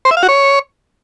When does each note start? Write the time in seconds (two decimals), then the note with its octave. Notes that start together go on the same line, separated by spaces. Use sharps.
0.05 C5
0.11 E5
0.17 F5
0.23 F#4
0.29 C#5